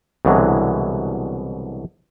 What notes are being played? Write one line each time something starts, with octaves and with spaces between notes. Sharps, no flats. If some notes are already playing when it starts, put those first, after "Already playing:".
C2 B2 D3 E3 F#3 G#3